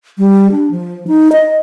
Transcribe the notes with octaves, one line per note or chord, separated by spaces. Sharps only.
G3
D4
F3
D#4
D#5